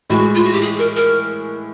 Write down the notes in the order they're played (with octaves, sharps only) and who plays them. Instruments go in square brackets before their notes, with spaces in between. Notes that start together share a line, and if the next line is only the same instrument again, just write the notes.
[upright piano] A2 E3 G#3 [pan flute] F#4
[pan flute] F4
F#4
G4
G#4
A#4
A#4